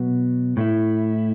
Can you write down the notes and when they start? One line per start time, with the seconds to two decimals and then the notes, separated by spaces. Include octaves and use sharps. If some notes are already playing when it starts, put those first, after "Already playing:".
Already playing: B2 F#3 B3
0.57 A2 A3 E4